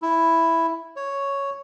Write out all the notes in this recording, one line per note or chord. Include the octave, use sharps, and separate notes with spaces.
E4
C#5